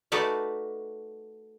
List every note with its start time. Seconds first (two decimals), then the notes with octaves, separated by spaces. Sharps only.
0.12 A3 D#4 F#4 B4 D5 F5